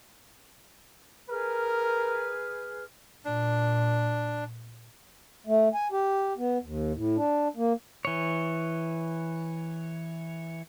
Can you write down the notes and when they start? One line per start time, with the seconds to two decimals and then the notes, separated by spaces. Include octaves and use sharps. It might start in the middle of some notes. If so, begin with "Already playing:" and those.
1.29 G#4 A#4 B4 F6
3.25 A#2 D4
5.47 A3
5.74 G#5
5.92 G4
6.38 B3
6.63 D#2
6.95 A2
7.16 D4
7.57 A#3
8.05 E3 C#5